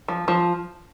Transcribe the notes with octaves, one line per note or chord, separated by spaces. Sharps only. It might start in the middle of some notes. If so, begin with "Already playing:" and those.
F3
F3